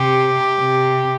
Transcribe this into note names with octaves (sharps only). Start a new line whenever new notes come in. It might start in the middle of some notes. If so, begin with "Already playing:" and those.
Already playing: C3 G4
C3